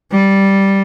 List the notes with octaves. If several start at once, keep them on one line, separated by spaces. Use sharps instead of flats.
G3